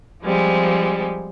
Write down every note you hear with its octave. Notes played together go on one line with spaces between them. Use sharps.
F3 G3 G#3 C4